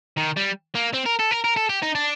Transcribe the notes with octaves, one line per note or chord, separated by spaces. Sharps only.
D#3
G3
A#3
C4
A#4
A4
A#4
A#4
A4
G4
D#4
D4